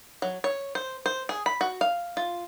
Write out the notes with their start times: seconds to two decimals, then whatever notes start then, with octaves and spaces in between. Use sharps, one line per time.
0.22 F#3
0.44 C#5
0.75 C5
1.06 C5
1.29 G#4
1.46 B5
1.61 F#4
1.81 F5
2.17 F4